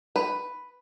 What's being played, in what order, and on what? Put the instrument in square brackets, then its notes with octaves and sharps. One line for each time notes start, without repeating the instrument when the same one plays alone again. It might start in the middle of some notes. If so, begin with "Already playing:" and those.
[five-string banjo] B4